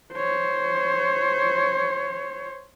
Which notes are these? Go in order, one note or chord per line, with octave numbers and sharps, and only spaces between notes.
C5 C#5